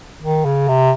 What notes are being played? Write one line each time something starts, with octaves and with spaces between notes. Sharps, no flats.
D#3
C#3
C3